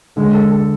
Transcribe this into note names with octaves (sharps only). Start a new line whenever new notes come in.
D3 G#3
A4
A4